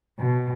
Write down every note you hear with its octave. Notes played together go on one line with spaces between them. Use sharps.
B2